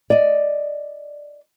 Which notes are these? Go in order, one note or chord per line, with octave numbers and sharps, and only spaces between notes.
D5 D#5